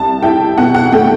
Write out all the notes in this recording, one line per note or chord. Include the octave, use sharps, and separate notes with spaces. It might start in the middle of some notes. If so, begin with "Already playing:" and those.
Already playing: C2 A5
E4 G5
B2 F#5
F#5
F#5
A3 G5